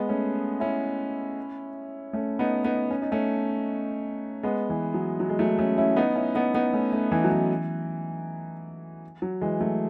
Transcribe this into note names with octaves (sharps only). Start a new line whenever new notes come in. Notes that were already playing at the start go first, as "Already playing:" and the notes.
Already playing: G#3 B3
A3 C#4
C#4 E4
A3 C#4
B3 D#4
B3 D#4
C#4
D#4
A3 C#4
G#3 B3
E3
F#3
F#3
G#3
F#3 A3
A3 C#4
C#4 E4
B3 D#4
C#4 E4
B3 D#4
B3 D#4
A3 C#4
A3 C#4
E3
F#3
E3
F#3
E3 G#3
F#3 A3